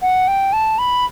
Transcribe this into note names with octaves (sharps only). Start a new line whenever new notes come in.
F#5
G5
A5
B5